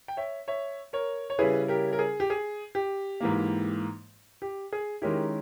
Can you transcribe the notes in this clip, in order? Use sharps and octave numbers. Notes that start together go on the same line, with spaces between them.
G5
C#5 E5
C#5 E5
A#4 C#5
C#5
C#3 G3 C#4 E4 G#4 B4
G4 A#4
A#4
G#4
G4
G#4
G4
G#2 E3 A#3
G4
G#4
D#3 G#3 C#4 E4 G4 A#4